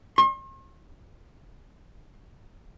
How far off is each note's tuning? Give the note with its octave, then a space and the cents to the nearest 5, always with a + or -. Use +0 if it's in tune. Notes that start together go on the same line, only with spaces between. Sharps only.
C6 +45